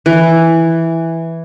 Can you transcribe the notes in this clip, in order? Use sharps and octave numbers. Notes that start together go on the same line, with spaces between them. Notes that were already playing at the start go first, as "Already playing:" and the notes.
E3